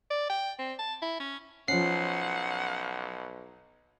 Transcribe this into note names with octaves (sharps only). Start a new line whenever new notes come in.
D5
G5
C4
A5
E4
C#4
B1 F3 C#4 F#5 C7